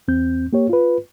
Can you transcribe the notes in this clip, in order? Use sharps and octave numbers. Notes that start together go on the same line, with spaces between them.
E2 C4 G6
A#3 G4 C#5
F4 B4